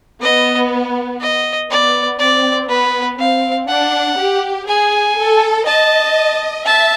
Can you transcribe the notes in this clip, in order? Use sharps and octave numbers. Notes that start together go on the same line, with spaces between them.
B3 D#5
D#5
B3 D5
C4 D5
B3 B4
C4 F5
D4 F#5
G4
G#4 G#5
A4
D#5 A5
E5 A5